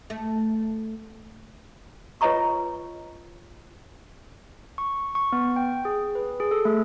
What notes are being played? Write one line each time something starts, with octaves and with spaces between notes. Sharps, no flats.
A3
F4 B4 C#5 D#5 A#5 C#6
C#6
C#6
B3
G5
G#4
B4
G#4
A4
A3